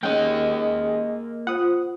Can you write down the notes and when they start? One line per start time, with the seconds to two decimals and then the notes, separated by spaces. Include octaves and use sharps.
0.03 G#3 A#3 C#4 D#5 F#5 G5
1.47 F4 C5 F#5 D#6